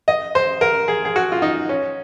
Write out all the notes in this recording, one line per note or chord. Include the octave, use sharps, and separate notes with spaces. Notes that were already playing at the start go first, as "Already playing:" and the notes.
D#5
C5
A#4
G#4
G#4
F#4
F4
D#4
C#4